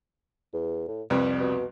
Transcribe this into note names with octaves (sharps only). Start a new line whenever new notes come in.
E2
A2
C2 F2 G3 B4
B2